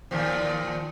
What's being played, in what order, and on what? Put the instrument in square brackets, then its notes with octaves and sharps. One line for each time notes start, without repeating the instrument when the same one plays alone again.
[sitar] D#2 A#2 F3